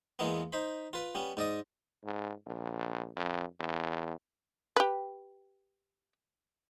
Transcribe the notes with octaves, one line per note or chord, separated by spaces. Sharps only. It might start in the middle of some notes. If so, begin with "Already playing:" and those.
E2 E3 G#3 A#3 B3
D#4 C5 B5
F4 B4
G3 B3 C#4
G#2 D5 D#5 D#6
G#2
A#1
F2
E2
G4 B4